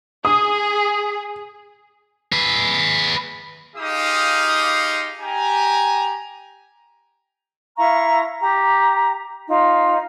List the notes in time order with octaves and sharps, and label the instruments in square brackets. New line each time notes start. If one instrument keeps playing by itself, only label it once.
[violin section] G#4 [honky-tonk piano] D#6
[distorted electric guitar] G#4 B4
[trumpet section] D#4 F4 G4 G#4 F5 D#6
G4 G#5 A#5
[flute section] E4 F5 A#5 C#6
G4 A#5
D#4 F4